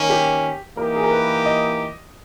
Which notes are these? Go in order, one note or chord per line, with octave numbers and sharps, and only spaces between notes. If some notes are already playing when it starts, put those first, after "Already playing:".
Already playing: D#3 A#3 C#4
G4
E3 A#3 D#4 G4 A#4
G#4
A#4
B4
D#5